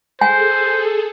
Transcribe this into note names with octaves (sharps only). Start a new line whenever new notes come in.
G#4 A4 C5 G#5